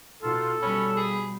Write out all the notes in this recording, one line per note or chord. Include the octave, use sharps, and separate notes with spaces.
B2 D#4 F4 A4
B2 G3 C#4 B5
G#4